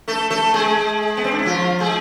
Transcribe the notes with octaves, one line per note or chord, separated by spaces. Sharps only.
A3 A4
A3 A4
G#3 G#4
B3
C4
D4
E4
F3 F4
G#3 G#4